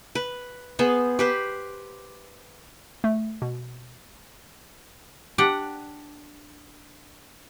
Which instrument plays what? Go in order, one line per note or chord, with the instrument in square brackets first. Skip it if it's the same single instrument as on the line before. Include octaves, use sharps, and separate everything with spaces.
[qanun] B4
B3 G#4 C5
G4 B4 C5
[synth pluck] A3
B2
[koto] D4 G4 F#5